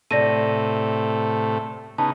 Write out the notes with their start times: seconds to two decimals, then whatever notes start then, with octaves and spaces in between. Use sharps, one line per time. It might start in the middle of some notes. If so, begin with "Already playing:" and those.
0.11 A2 C3 A3 D5 A#6 D#7
1.98 C#3 B3 D#4 A5